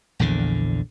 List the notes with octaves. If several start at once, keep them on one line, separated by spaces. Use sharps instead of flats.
A#1 E2 D3